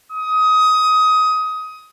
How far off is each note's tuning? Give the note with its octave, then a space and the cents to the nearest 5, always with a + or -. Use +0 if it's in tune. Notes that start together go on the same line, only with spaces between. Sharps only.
D#6 +20